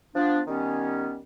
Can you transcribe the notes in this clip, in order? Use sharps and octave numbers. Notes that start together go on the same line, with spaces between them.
F3 B3 D4
D#3 G3 B3 C#4